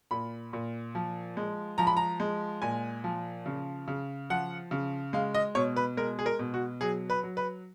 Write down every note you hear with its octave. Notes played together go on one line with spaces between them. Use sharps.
A#2 B5
A#2
F3
G#3
F3 A#5
B5
A#5
G#3
A#2 G#5
F3
C#3
C#3
F3 F#5
C#3
G#3 F5
D#5
B2 C#5
B4
G#3 A#4
G#4
A#4
B2
F#4
F#3 G#4
B4
F#3
B4